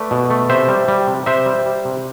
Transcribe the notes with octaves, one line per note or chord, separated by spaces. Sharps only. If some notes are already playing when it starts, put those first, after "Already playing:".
Already playing: A3 B4 D5
B2
A3
C3 C5 E5
G3
G3
C3
C3 C5 E5
G3
G3
C3